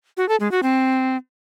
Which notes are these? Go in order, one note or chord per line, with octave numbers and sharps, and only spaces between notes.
F#4
A4
G#3
F#4
C4